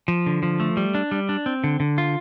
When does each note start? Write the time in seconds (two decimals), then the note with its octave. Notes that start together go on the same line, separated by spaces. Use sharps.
0.08 F3
0.26 D3
0.43 F3
0.60 A3
0.77 G3
0.95 D4
1.11 G3
1.29 D4
1.46 C4
1.64 D3
1.80 D3
1.98 F4